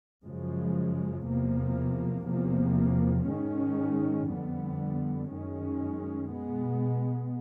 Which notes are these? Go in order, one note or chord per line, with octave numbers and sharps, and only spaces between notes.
F#2 C#3 F3 G#3
E2 C3 F3 A#3
E2 C3 F3 A#3
G#2 D#3 G#3 C#4
F2 D3 G3 B3
F#2 D#3 G#3 C#4
B2 G#3 B3